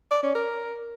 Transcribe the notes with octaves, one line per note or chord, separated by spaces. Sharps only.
D5
C#4
A#4